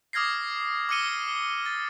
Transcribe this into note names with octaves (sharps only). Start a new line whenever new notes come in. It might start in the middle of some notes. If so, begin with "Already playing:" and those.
D6 D#6 F6 G#6 A#6 C7
D6 E6 F6 C#7 D#7 G7
A6